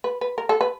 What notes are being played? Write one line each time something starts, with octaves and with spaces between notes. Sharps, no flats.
B4
B4
A#4
A4
B4